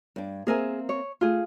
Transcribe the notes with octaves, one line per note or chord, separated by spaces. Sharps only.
G2 D4
A#3 C4 G#4 A#4 E5 G#5
C#5
A3 F4 G#4